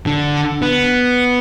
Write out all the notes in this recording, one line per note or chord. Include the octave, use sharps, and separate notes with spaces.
D3
B3